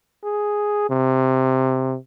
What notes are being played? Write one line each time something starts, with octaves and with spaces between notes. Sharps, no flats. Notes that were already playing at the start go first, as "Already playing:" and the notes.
G#4
C3